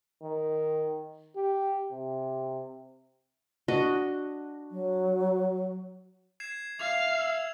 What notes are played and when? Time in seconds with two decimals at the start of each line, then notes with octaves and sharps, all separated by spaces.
0.23 D#3
1.36 G4
1.92 C3
3.68 D4 F#4 D#5
4.71 F#3
6.40 G#6 C7 E7
6.79 E5 F5 F7
7.19 E6